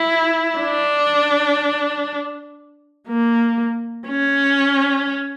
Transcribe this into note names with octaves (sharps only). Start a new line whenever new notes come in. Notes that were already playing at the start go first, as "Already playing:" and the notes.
Already playing: E4
D4
A#3
C#4